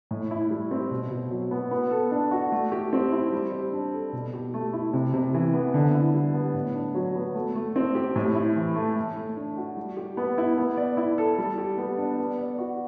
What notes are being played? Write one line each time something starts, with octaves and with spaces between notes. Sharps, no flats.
A2
E4
G3
C4
B2
B2
F#3
B3
B3
A4
D4
F#4
A3
G4
C4
E4
G3
C5
D4
A4
B2
G4
A3
E4
C3
C3
E3
B3
D3
E4
G3
B3
A2
D4
F#3
B3
A3
A3
C4
G4
A2
E4
E3
A3
A3
A3
D4
F#4
G3
G4
B3
E4
B3
D5
E4
A4
G3
G4
B3
D4
B3
D5
F#4